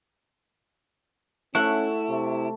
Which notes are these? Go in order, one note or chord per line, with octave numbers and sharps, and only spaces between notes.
A3 C#4 E4 F#5
C3